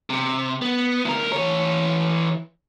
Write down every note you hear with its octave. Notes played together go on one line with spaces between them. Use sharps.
C3
B3
D2 A#4
E3 C#5